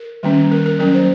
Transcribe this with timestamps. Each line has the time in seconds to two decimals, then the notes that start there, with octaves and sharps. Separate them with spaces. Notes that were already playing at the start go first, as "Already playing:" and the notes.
Already playing: A#4
0.23 D#3 G3 A#3 C#4
0.51 A#4
0.66 A#4
0.79 F#3 A#3 C#4 A#4
0.94 C5